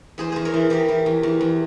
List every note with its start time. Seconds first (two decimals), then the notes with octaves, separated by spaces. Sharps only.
0.18 E2 G#4 C5
0.32 E2 G#4 C5
0.45 A#4 C#5
0.54 E3
0.70 E3 G4 A#4
0.88 E3
1.06 E2
1.23 E2
1.41 E2